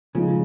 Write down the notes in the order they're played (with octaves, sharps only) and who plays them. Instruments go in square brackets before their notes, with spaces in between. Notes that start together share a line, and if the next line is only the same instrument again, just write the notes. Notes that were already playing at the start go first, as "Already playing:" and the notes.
[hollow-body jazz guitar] C#3 [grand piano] F3 G#3 D#4